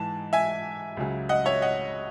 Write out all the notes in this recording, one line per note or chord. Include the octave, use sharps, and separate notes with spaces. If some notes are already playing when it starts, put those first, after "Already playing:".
Already playing: G#2 E3 G#3 A5
E5 G#5
C#2 C#3 F#3
D#5 F#5
C#5 E5
D#5 F#5